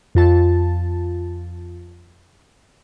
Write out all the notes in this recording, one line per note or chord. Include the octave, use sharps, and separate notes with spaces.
F2 F4 A5